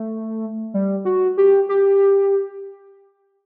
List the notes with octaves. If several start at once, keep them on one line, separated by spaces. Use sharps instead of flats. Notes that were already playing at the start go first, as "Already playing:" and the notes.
Already playing: A3
G3
F#4
G4
G4